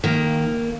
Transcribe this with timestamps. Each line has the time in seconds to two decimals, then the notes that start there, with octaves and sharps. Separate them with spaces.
0.04 D#3 A#3